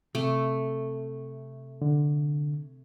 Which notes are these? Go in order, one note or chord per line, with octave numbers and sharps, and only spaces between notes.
C3 A3
D3